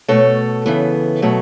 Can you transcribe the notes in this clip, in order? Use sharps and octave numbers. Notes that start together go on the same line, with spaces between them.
B2 A3 A4 C#5
C#3 E3 B3
B2 F#3 A3